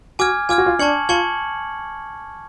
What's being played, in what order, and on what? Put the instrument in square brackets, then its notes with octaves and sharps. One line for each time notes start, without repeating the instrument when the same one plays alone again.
[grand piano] F#4 [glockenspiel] G#5 D6 F6 G#6
[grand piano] F4 [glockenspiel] G#5 D6 F6 G#6
[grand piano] F#4
F4
[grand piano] D4 [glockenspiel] A5 C#6 G#6 C#7 F#7
[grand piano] F4 [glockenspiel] A5 C#6 G#6 C#7 F#7